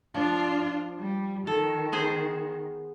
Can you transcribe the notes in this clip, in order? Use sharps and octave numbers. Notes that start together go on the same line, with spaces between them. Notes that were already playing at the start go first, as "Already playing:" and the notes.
F3 D4 F4
G3
D#3 A4
B3 G#4 C5